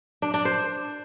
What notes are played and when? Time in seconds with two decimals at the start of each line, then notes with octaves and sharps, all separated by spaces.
0.22 D4
0.34 D4
0.45 C5